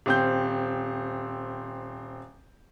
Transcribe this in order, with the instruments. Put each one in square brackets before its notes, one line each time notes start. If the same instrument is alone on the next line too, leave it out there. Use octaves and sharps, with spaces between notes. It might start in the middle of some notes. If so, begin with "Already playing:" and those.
[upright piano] D#1 C4 G6